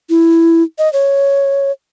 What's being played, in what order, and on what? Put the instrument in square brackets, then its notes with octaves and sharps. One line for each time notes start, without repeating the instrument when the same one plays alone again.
[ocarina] E4
D#5
C#5